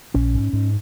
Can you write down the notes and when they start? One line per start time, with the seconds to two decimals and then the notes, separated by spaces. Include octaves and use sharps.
0.14 A#1 C#4
0.35 G#2
0.53 G#2